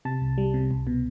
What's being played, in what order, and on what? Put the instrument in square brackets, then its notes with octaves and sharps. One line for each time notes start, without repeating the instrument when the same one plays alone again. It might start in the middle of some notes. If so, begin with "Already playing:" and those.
[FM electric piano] C3 A5
C2
G3
C3
C2
B2